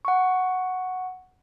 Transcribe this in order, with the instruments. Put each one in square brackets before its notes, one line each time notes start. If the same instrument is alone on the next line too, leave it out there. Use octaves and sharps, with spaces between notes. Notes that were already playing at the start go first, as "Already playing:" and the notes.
[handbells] F#5 C#6